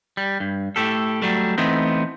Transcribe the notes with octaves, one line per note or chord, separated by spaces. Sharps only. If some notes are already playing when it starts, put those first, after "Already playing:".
G3
G2
A2 A3 G4 A4
F#3 G3 A3
E3 A3 B3 C4 D#4